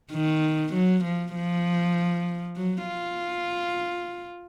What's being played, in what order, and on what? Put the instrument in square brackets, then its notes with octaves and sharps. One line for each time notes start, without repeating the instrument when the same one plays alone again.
[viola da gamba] D#3
F#3
F3
F3
F#3
F4